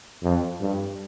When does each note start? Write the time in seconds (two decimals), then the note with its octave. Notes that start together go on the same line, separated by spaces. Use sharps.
0.23 F2
0.61 G2